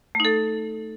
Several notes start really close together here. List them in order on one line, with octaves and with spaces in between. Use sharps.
A3 D#4 A4